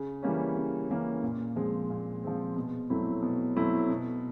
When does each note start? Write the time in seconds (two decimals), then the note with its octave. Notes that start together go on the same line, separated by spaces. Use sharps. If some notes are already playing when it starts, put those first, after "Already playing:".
Already playing: C#3
0.23 E3 G3 A#3 C#4
0.56 C#3
0.90 E3 G3 A#3 C#4
1.23 A#2
1.56 F3 G#3 C4
1.90 A#2
2.23 F3 G#3 C4
2.56 B2
2.90 F#3 A3 C4 E4
3.22 B2
3.56 F#3 A3 C4 E4
3.89 B2